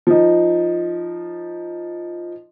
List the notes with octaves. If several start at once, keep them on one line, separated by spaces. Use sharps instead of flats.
F3 D#4